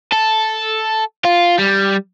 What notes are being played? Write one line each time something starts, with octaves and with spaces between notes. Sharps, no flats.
A4
F4
G3